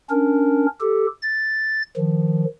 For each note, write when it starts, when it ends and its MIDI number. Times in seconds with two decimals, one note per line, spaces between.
0.10 0.66 61
0.10 0.66 62
0.10 0.66 70
0.81 1.07 67
0.81 1.07 69
1.22 1.82 93
1.97 2.45 51
1.97 2.45 53